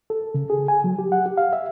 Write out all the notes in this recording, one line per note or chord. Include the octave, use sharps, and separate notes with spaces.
A4
C#3
G#4
G#5
F#3
G4
F#5
G4
F5
E5